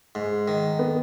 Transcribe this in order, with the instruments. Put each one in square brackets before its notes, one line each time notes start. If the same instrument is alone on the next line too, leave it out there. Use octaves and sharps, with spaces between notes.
[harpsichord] G#2
D#3
[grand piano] B3